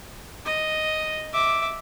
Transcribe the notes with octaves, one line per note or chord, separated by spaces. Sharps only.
D#5
E5 D6